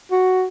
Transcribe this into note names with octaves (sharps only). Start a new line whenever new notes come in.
F#4